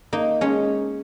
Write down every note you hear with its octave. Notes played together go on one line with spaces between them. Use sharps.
A#3 D#4
G#3 C#4